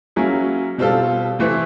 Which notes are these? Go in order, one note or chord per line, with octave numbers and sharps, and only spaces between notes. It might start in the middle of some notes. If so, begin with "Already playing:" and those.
F#3 A#3 C#4 E4 G#4
B2 G3 C4 F4 A4
C3 E3 A3 C4 E4